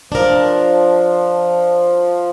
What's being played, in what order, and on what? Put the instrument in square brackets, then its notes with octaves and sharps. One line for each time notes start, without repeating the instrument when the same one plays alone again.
[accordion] F3 [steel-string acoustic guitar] D4 A#4